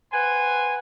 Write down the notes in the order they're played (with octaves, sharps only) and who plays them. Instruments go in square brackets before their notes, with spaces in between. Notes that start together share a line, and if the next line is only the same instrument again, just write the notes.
[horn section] B4 C5 F#5 G#5